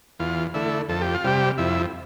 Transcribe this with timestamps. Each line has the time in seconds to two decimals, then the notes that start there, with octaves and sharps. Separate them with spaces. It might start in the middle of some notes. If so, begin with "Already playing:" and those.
0.19 E2 F4
0.54 D3 A3 E4
0.89 F2 A4
1.01 G4
1.14 F4
1.24 C3 G3 G4
1.58 F2 E4